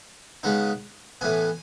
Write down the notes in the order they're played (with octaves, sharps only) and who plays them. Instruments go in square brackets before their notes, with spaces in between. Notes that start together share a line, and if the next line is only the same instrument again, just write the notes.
[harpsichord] C#3 G#3 B3 D#4
A2 E3 B3 G#5